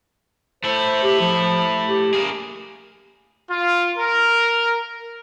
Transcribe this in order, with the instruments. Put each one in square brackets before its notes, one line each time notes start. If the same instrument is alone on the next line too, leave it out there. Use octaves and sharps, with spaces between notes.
[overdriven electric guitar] A3 E4 [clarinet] C5
[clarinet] G4
F3
G4
[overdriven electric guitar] A#3 G#4
[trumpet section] F4
A#4